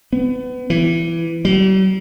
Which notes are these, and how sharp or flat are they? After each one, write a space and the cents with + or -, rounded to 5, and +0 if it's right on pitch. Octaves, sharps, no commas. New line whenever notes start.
B3 +30
E3 +20
G3 -45